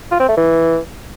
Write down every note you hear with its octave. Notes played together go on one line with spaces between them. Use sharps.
F4
C4
A3
E3